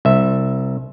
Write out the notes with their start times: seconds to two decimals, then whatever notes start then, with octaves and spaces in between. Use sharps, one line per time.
0.05 C2 E5